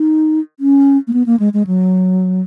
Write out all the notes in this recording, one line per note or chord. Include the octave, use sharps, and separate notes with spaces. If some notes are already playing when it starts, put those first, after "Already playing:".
Already playing: D#4
C#4
A#3
B3
A#3
G#3
G#3
F#3